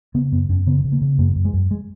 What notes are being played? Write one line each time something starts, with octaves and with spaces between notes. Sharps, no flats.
C#3 B3
F#2 B3
F#2 C#4
C#3 B3
C#3
A#3
C#3
F#2 A#3
F#2
G#3
F#2
G#3